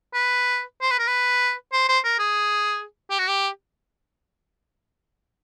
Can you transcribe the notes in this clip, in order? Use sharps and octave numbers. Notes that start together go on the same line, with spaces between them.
B4
C5
B4
A#4
B4
C5
C5
A#4
G#4
G4
F#4
G4